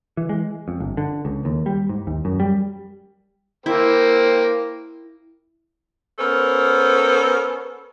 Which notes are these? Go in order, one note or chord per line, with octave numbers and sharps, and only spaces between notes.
E3
G#3
F2
G1
D3
C#2
D#2
G3
G#2
D#2
F#2
G3
A#3 E4 C5 G5
B3 C#4 A4 A#4 C5